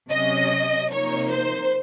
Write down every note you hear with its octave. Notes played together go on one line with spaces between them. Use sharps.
C3 F#3 C#4 D#5
C3 F3 A#3 D#4 C#5
C5